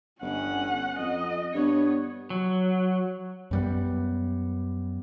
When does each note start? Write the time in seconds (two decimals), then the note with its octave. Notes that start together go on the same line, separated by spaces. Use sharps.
0.21 G1 C#4 F#5
0.98 F2 D#5
1.54 G2 B3 C#5
2.30 F#3
3.51 F#2 G3 B3